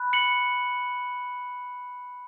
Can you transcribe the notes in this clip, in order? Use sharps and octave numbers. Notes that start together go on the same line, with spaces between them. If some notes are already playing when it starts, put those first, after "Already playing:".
Already playing: B5 F#6
C#7 F#7